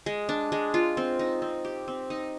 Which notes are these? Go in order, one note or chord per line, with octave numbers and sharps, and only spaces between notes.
G#3
D4
G#3
F4
C4
D#4
C4
G4
C4
D#4